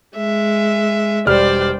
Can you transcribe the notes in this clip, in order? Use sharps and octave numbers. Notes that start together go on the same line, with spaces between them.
G#3 E5
E1 G3 C5 D5 G5 F6